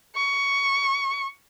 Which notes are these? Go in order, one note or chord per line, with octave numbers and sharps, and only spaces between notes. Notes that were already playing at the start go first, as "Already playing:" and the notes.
C#6